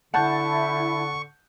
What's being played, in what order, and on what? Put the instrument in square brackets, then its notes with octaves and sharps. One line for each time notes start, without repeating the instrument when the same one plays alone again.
[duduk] D3 [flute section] E4 [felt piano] F#5 A5 G6 [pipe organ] C#6